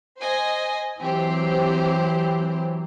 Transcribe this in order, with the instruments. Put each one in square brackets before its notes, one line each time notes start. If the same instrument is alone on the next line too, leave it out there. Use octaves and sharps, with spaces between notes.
[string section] C5 D#5 G#5
[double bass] E3 F#3 [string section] C4 G4 C5